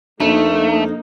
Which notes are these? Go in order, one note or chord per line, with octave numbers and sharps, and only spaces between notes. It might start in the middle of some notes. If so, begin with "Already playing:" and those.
F2 A3 A#3 D4 D#4